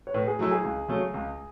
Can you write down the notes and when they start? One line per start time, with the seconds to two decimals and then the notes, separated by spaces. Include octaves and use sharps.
0.07 C#5
0.14 A2 B4
0.28 G#4
0.39 F#3 A3 E4 F#4
0.51 G#4
0.64 C#2
0.88 C#3 F#3 A3 C#4
1.14 C#2